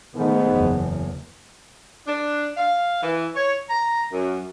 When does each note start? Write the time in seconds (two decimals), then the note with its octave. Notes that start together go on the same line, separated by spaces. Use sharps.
0.15 G#2 D#3 A3 B3
0.49 F#1 E2
2.07 D4
2.57 F5
3.02 E3
3.35 C#5
3.69 A#5
4.12 F#2